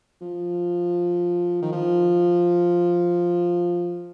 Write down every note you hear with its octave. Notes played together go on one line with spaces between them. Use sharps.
F3
D#3
F3